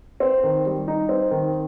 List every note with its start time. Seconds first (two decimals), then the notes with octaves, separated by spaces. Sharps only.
0.20 C4
0.44 D#3
0.66 G3
0.88 D#4
1.09 C4
1.31 D#3